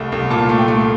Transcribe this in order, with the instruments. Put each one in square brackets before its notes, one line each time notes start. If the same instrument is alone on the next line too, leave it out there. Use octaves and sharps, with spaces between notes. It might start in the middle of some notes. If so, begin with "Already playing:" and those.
Already playing: [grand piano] C2 A3
C2
A#2 A5
A3
G5
A3